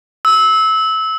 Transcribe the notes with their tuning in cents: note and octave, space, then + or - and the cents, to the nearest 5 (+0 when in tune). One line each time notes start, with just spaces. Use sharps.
E6 -20